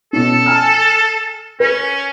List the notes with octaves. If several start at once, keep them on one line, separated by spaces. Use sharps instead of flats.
B2 C#4 A4
G#5 A5 F6
C#4 B4